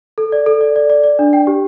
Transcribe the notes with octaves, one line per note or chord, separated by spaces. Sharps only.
A4
D5
A4
D5
D5
D5
D5
D4
G5
G4